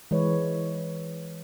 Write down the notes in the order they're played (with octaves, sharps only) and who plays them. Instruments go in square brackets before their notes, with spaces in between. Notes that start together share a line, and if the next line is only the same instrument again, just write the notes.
[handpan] E3 G#3 B4 C#5